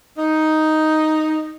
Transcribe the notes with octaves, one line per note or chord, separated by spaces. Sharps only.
D#4